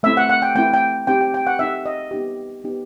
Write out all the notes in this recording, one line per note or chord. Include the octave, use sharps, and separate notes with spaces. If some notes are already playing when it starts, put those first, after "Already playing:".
A3 C4 E4 E5
F#5
F#5
G5
A3 C4 E4 G5
G5
C4 D#4 G4 G5
G5
G5
F#5
C4 D#4 G4 E5
D#5
B3 D#4 G4
B3 D#4 G4